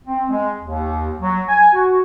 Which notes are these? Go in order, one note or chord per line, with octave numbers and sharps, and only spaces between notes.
C4
G#3
D#2
F#3
G#5
F#4